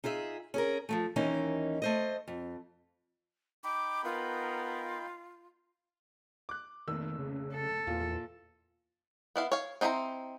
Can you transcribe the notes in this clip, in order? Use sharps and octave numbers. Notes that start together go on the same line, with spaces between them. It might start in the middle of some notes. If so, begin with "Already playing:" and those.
D#4 F4 G#4 E5
C#4 G#4 A#4
F3 F#3 A3
D#2 E3 A#3 C#4 D#4
A3 C5 D#5
F2
D#4 G5 B5 D6
B3 F4 A#4
D6 F#6
F1 A#1 D#3 E6
C#3
A4
E2 A#2 F4
B3 E4 F5
C#5 F5
C4 D#4 E4 C5 A#5